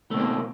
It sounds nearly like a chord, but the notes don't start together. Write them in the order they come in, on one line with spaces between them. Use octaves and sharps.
A3 B2 C4 A#3